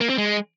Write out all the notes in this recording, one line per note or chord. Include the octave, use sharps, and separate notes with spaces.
A#3
C4
G#3